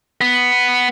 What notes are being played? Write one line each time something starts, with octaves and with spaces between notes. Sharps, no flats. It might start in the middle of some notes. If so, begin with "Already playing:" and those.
B3